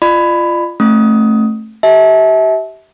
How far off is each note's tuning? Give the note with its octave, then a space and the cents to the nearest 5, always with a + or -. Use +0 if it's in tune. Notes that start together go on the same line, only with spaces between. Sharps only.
F4 -15 D5 +40 B5 +15
A3 +0 C#4 -45 D#6 +15
G4 -35 E5 -30 A5 -35